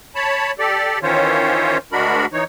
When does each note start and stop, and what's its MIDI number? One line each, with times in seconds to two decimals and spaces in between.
0.15 0.52 73
0.15 0.52 81
0.15 0.52 83
0.59 0.99 67
0.59 0.99 69
0.59 0.99 74
1.03 1.78 51
1.03 1.78 52
1.03 1.78 61
1.03 1.78 65
1.03 1.78 72
1.03 1.78 73
1.92 2.26 38
1.92 2.26 56
1.92 2.26 62
1.92 2.26 66
1.92 2.26 70
1.92 2.26 83
2.33 2.44 52
2.33 2.44 63
2.33 2.44 73